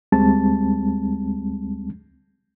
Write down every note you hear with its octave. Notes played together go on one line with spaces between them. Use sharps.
D2 G3 G#3 C4 A5